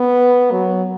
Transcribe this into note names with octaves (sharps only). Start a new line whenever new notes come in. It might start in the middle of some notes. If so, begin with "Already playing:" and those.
Already playing: B3
F#3